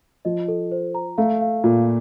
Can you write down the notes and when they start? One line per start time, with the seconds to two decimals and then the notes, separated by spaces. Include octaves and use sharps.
0.25 F3 D#5
0.48 A4
0.72 C5
0.95 A#5
1.18 A3 F5
1.41 F5
1.64 A#2 F4